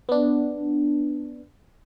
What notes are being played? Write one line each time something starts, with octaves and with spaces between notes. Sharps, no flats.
B3 D4